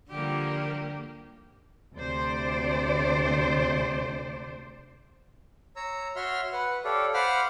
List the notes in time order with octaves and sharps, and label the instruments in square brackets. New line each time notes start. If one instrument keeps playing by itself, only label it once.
[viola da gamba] D3 F3 G3 [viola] A#3 G4
[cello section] D2 C3 C5 D5
[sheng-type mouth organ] C#5 A#5 E6
F#4 C#5 E5 C6 F6
B4 F#5
G4 A4 C#5 D5 F5
C5 F5 F#5 B5 D6 F6